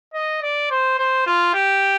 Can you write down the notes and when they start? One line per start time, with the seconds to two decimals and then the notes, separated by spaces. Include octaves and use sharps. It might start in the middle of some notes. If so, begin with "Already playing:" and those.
0.14 D#5
0.42 D5
0.71 C5
0.98 C5
1.27 F4
1.54 G4